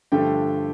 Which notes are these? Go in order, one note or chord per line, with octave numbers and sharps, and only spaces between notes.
G2 D3 F3 A3 G4 G5